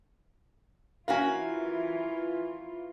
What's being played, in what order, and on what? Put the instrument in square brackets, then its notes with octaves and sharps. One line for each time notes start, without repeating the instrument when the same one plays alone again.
[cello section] E3 F4 [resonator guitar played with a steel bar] C#4 F#4 A#4 [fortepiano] F5 G#5